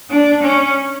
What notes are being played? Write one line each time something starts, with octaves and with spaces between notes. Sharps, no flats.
D4
C#4